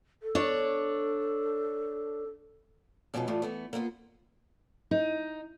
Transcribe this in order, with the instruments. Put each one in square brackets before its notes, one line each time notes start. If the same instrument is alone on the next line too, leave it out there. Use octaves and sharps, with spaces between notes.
[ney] A4
[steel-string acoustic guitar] D4 C#5
F2 B2 G#3 C#4 D#4 B4
A2 E3 G3 A3 F4
E3 A3 B3
A#3 B3 E4 F4
D#4